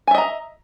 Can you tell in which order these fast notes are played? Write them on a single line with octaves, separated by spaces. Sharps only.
G#5 E5 D#5 A#5